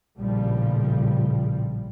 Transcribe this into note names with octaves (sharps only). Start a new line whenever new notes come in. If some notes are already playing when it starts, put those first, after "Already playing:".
A#1 A2 C#3 F3 G3